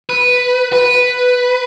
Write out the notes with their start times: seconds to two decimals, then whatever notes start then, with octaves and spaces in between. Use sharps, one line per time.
0.10 B4
0.73 B4